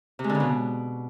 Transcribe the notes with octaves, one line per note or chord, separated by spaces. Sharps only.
C3
G#3
D3
C#3
B2